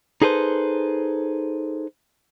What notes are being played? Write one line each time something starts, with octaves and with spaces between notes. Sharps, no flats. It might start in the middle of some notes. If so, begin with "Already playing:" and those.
D#4 G#4 A4 B4 C5